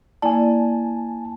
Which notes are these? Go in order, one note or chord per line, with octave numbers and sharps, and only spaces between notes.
A#3 E4 D5 G#5 A5